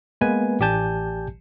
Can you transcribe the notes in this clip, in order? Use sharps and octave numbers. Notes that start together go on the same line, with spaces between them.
G#3 A#3 B3 B4 G#5
A1 G4 D5 G#5 A5 G6